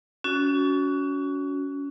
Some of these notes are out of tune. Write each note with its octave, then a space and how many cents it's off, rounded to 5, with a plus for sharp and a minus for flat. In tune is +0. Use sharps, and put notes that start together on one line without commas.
C#4 +30 F#4 +0